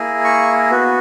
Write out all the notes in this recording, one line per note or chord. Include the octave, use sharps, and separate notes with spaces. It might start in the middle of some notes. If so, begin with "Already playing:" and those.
Already playing: A#3 E4 G#4
C#6
B3 F#4